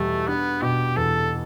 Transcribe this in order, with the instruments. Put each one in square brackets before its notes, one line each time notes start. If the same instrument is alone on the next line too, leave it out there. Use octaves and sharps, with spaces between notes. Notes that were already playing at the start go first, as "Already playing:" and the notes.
Already playing: [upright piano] E2 B2 G3 [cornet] A3
[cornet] B3 [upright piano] D4
[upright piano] B2 [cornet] G4
[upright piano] E2 [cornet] A4